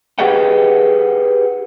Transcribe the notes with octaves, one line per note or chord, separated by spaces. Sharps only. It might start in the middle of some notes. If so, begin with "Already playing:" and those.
G4 G#4 B4 D#5 F#5 G5